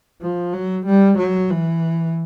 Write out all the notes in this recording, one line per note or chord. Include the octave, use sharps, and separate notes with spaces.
F3
F#3
G3
F#3
E3